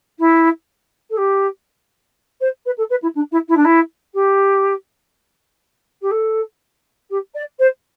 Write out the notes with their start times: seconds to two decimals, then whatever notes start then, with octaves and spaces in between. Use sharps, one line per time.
0.19 E4
1.10 A4
1.17 G4
2.40 C5
2.65 B4
2.77 A4
2.90 B4
3.02 E4
3.15 D4
3.31 E4
3.48 E4
3.56 D4
3.64 E4
4.14 G4
6.01 G4
6.11 A4
7.10 G4
7.34 D5
7.59 C5